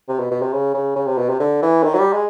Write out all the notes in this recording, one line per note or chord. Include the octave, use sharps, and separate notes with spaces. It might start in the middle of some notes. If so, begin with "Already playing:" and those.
C3
B2
B2
C3
C#3
C#3
C#3
C3
B2
C3
D3
E3
D#3
F#3
G3
G#3